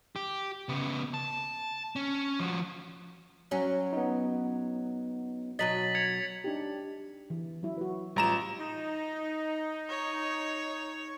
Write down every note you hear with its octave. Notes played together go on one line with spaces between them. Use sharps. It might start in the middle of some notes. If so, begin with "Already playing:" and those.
G4
C#3 B3
A5
C#4
F3 F#4
F#3 C#4
B3 D#4
B2 F#3 D#5 A6 B6 F#7
G#6 C#7 F7
D4 D#4 G4
E3
F#3 E4
F#4 B4
A1 G3 F4 A#5 E7
D#4
C#5